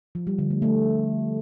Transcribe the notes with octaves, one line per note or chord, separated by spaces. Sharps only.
F3
G3
D3
A3
A3